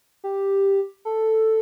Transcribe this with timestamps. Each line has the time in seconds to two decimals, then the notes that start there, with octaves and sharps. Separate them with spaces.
0.24 G4
1.05 A4